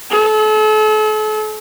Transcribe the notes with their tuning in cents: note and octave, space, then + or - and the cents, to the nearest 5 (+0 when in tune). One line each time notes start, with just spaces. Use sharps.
A4 -40